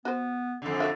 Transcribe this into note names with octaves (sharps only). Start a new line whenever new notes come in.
B3 F#4 C5
F2 D3 A4
F#4 E5 F5